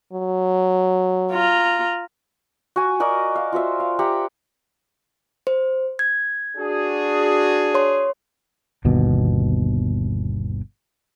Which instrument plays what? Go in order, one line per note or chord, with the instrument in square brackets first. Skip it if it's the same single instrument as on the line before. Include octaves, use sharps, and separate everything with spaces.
[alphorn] F#3
[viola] F4 A#5
[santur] F#4 G#5
F#4 A#4 D5 D#5
F5
F4 F#4 C5 E5
F5
G4 E5 F#5 A#5
[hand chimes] C5
G#6
[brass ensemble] D4 F#4 G#4
[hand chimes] C#5 C6
[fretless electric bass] G1 D#2 B2